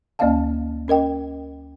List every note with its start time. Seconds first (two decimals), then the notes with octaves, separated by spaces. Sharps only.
0.19 D2 A#3 C#4 D#5 F5 A5
0.88 C#4 A#4 D#5 G5